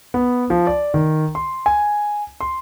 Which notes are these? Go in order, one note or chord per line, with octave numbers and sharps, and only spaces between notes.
B3
F3
D5
D#3
C6
G#5
C6